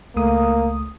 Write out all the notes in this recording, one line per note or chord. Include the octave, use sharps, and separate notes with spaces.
C#2 A3 A#3 D#6